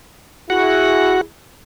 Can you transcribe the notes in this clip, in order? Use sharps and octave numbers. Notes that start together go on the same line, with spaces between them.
E4 F#4 G#4 F#5